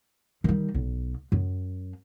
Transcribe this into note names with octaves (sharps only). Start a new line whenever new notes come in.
D#3 G3
B1
F#2